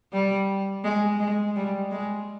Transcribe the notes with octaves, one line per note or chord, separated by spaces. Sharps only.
G3
G#3
G#3
G3
G#3